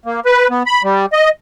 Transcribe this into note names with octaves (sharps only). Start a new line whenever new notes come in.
A#3
B4
B3
B5
G3
D#5